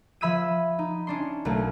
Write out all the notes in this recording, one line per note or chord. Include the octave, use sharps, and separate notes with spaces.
F3 E5 B5 E6 G#6 D#7
D#4
C#4 D4 C6
B1 A3 A#3